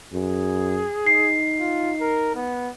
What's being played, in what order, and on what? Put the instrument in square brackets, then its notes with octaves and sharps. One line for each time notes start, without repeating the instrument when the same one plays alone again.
[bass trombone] F#2 [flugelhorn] G#4
[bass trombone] D#4 [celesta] C7
[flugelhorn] F4
A#4
B3